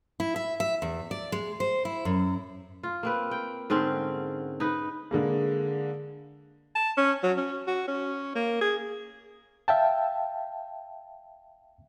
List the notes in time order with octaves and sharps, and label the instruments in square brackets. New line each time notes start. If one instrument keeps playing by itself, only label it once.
[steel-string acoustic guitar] E4
E5
E5
E2
D5
G#3
C5
E4
F#2
[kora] F4
A#3 C4 B4
G5
G#2 D3 C4 C#4
D#4 B4
[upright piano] D3 G#3 A#3
[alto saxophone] A5
C#4
F#3
C#4
F#4
C#4
A#3
G#4
[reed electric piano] E5 F5 G5 A5